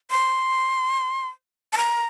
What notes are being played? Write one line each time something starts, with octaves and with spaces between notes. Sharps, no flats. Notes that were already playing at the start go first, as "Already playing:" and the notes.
C6
A5
A#5